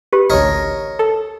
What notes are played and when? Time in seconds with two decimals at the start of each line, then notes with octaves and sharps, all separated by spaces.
0.13 G4 B4
0.30 A1 D2 A#4 C#5 D#5
0.99 A4